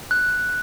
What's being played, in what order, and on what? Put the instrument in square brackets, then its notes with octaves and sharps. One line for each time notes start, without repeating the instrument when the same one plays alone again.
[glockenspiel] F#6